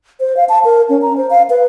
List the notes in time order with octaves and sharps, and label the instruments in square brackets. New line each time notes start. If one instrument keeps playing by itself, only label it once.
[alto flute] C5
F5
A5
A#4
C#4
A#5
C5
F5
B4